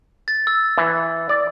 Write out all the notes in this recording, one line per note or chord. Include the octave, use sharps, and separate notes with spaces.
A6
E6
E3
D5